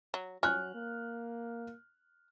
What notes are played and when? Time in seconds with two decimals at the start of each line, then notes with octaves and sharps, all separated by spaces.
0.14 F#3
0.43 F#3 C#4 F6 F#6
0.75 A#3